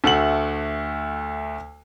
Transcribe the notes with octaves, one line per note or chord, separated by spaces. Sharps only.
D2 A3 F#5 F#7